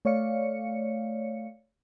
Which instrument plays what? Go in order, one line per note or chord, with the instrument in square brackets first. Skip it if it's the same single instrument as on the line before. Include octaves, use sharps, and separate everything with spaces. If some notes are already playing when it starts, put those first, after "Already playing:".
[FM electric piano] A3 C#5 D5 F5 C#7